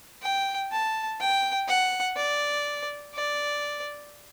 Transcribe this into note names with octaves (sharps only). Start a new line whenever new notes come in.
G5
A5
G5
F#5
D5
D5